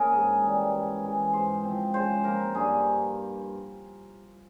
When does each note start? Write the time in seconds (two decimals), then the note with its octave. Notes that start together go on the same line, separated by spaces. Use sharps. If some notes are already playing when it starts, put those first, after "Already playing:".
Already playing: A#3 C#4 E4 G#4 A#4
0.12 G#2
0.43 E3 G3
0.72 G#2
1.03 E3 G#3
1.33 G#2 C5
1.64 F3 C4
1.94 C#3 C5
2.24 F3 A#3 A#4
2.54 G2 G#4